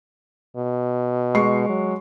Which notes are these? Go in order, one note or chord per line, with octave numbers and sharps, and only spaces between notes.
B2
G#3 C#6 C7
F#3